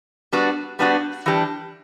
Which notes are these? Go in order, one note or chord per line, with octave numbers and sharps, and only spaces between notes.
G3 B3 D4 F#4
G3 B3 D4 F#4
E3 G3 D4 G4